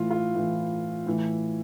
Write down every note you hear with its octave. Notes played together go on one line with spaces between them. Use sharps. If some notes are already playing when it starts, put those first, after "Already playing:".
Already playing: A2 E3 F4
F4
A2 E3
A2 E3